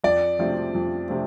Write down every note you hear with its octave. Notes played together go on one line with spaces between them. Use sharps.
F2 D5
C3 F3 A3 C4
F2
C3 F3 A3 C4